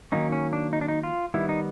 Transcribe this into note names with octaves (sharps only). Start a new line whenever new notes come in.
D#3 F#3 A#3 C#4 D#4
C#4
D4
D#4
D4
D#4
F4
D#3 G3 B3 E4
D#4